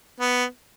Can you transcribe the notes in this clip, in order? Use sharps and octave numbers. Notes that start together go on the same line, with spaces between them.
B3